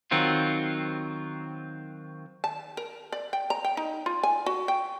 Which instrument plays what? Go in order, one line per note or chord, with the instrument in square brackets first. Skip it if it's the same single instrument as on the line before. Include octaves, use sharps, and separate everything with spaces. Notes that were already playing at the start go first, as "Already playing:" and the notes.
[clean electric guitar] D#3 F#3 C4 F4
[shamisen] A5
A#4
D5
G5
A#5
G5
D#4
F4
G#5
F#4
G5